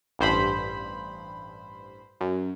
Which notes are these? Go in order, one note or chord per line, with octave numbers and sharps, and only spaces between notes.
A1 G2 C5 B5
F#2